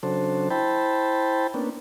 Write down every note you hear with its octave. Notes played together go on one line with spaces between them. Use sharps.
C#3 F#3 D4 A4 C5
E4 C5 G5 A5 B5
A#3 B3 C#4 D4